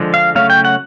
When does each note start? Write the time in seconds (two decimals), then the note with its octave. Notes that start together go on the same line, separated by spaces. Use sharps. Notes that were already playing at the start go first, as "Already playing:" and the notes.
Already playing: D3 F3 G#3
0.14 F5
0.35 C#3 F#3 A3 C#4 F5
0.50 G5
0.65 F#5